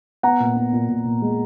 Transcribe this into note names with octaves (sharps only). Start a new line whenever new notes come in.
B3 F#5 A#5
A#2
B3
A#2
A#2
A#2
G#3